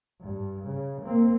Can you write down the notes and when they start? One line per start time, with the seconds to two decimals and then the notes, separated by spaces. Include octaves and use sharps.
0.21 G2
0.65 C#3
1.02 A#3 C4